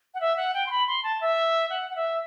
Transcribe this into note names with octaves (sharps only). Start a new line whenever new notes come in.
F#5
E5
F#5
G5
C6
B5
C6
A5
E5
F#5
F#5
E5